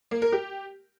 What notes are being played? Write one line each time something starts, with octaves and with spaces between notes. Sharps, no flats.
A#3
A#4
G4